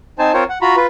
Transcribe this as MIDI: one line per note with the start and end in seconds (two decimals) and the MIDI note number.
0.19 0.32 60
0.19 0.32 63
0.19 0.32 72
0.19 0.32 80
0.19 0.32 81
0.33 0.44 60
0.33 0.44 65
0.33 0.44 70
0.33 0.44 72
0.33 0.44 73
0.49 0.58 78
0.61 0.76 65
0.61 0.76 66
0.61 0.76 82
0.61 0.76 83
0.76 0.87 65
0.76 0.87 71